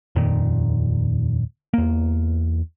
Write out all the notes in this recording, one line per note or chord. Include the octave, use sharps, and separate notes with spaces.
D#1 F2 A#2 D#3
E2 A#3